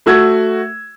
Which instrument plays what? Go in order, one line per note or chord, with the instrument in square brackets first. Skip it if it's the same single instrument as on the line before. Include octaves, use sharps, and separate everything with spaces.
[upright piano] A3 F#4 E6 G#6